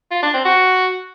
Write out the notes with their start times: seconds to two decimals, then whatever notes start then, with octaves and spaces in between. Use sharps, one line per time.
0.11 F4
0.23 D4
0.34 C4
0.45 F#4